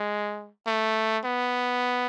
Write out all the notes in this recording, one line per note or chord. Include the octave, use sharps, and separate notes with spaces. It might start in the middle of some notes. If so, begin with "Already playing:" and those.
Already playing: G#3
A3
B3